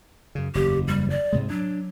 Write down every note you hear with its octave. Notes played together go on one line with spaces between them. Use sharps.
F#2 C#3
F#1 E2 G4
G3
D5
G#2 C3 G#3
F#3 D4